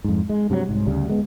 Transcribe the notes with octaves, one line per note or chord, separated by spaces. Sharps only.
F2 G#2
G#3
G2 C3 F3 F#3
C2 G#2
D2 C#3 G3
G#3 B3